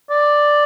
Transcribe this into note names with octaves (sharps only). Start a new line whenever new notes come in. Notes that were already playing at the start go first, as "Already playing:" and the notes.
D5